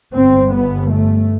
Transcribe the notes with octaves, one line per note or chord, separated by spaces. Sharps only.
G1 G2 C4
B3
A3